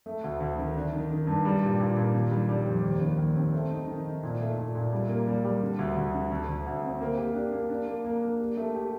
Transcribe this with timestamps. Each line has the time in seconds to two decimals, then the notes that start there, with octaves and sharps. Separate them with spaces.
0.06 A3
0.24 D2
0.40 D2
0.59 D#3
0.76 D4
0.93 D#3
1.11 D#3
1.27 G2
1.45 G3
1.63 A#2
1.80 A#2
1.97 A#2
2.14 D#3
2.31 G3
2.49 G3
2.66 F2
2.83 D#2
3.01 D#3
3.19 D#2
3.36 C4
3.54 A3
3.71 D#4
3.87 D#3
4.05 D#4
4.23 A#2
4.41 A3
4.57 A#2
4.75 A#2
4.93 G3
5.09 A#3
5.27 G3
5.45 G3
5.62 D3
5.79 D2
5.96 D2
6.14 D3
6.32 D2
6.48 D2
6.66 D2
6.84 C4
7.01 A#3
7.17 G4
7.35 D4
7.52 A#3
7.70 D4
7.87 A#3
8.05 A#3
8.22 A#3
8.40 G4
8.57 A3
8.75 G4